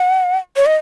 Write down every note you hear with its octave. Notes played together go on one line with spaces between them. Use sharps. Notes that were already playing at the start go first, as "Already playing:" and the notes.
Already playing: F#5
C#5
D#5